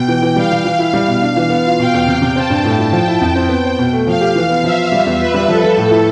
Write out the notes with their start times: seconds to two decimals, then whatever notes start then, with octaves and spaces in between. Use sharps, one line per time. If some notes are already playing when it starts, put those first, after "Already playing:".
Already playing: B2 G5
0.08 E3
0.22 E3
0.36 G3 F5
0.51 G3
0.65 E3
0.79 E4
0.93 G3
1.08 B2
1.22 D4
1.36 E3
1.50 B3 F5
1.65 F4
1.79 B2 G5
1.94 E2
2.07 C3
2.22 C3
2.35 C4 A5
2.50 G2
2.64 A2
2.79 E4
2.92 F3 G5
3.07 E4
3.21 F2
3.36 C4
3.49 B3
3.64 C5
3.79 B2
3.93 A3
4.07 F3 F5
4.21 G4
4.36 E3
4.49 B3
4.63 F3 E5
4.78 F4
4.92 G3
5.06 E2
5.20 F4 B4
5.34 G3
5.48 F3 A4
5.63 F3
5.77 A2
5.91 E4